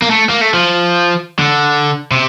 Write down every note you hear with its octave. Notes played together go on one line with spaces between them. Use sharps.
A#3
A3
A#3
A3
F3
D3
C3